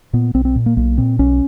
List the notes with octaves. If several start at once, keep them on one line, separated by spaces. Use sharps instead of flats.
A#2 B3
B1 C4
C4
A#2
A#3
B1 A#3
A#2 C4
B1 C#4